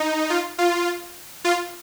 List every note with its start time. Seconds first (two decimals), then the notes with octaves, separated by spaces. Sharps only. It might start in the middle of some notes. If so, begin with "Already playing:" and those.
Already playing: D#4
0.30 F4
0.58 F4
1.44 F4